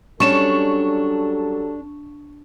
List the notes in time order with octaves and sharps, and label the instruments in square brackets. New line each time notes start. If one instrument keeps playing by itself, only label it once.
[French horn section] F#3 G4 A4 [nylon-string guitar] G3 C#4 [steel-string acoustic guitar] D4 [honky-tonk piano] C#6 E7